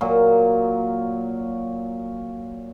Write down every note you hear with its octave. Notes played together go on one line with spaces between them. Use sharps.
A#2 F#3